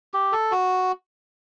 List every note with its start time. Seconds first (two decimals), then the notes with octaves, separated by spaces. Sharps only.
0.14 G4
0.32 A4
0.51 F#4